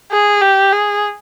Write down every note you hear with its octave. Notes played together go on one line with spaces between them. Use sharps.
G#4
G4
G#4